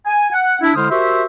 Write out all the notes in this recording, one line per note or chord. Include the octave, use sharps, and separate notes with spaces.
G#5
F#5
D4 E4
D3 G#3 E4 C5 D#6 F6
F#4 G4 A#4 C5 E5